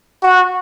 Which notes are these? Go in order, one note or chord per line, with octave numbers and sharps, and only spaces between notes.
F#4